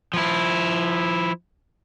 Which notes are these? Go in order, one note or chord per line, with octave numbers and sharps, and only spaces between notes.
F3 E4